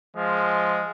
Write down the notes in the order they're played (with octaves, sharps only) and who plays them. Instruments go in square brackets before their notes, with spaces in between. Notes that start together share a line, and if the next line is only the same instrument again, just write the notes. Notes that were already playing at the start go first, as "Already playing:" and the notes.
[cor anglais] F3 [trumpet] G#3